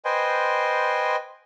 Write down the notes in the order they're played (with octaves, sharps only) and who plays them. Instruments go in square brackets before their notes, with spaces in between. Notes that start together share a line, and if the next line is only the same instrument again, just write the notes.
[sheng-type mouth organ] B4 C5 D#5 G5 G#5 C6